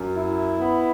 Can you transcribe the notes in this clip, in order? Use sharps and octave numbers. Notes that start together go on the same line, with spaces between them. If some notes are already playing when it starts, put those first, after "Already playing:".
Already playing: F#2
E4
B3